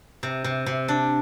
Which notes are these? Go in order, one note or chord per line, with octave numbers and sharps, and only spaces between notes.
C3
C3
C3
D4